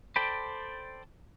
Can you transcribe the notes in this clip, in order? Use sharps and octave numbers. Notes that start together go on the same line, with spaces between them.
A4 C5 D5 G5 B5